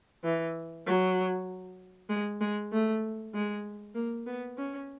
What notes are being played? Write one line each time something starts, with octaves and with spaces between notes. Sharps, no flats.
E3
F#3
G#3
G#3
A3
G#3
A#3
B3
C#4